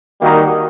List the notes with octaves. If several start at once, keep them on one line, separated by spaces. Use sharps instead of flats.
D#3 G3 A#3 D#4 F#4